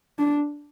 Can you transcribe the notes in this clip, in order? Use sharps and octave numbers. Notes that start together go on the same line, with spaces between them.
D4